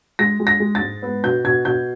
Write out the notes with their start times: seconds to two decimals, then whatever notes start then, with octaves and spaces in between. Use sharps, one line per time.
0.19 G#3 A#6
0.40 G#3
0.47 A#6
0.60 G#3
0.75 A6
0.81 G#2
1.02 B3
1.24 B2 G6
1.44 B2 G#6
1.65 B2 G6